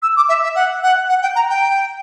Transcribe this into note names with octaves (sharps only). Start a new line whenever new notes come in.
E6
D6
E5
E5
F#5
F#5
F#5
G5
A#5
G5